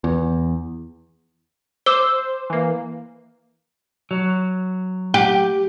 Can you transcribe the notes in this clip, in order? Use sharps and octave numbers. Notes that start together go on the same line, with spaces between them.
E2
C5 D6 E6 G7
E3 A#3
F#3
G4